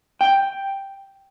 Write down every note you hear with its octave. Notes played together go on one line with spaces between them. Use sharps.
G5